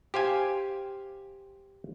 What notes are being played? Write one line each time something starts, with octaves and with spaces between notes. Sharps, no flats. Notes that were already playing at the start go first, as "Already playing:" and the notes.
G4 C5 F5 G#5